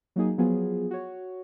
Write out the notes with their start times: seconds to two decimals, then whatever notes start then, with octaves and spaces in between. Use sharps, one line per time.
0.16 F#3 A#3 D#4 G#4
0.38 F3 F#3 B3 F4 G#4
0.91 F#4 C#5